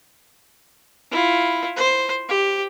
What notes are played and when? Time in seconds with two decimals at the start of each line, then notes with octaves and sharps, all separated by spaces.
1.12 E4 F4
1.76 C5
2.29 G4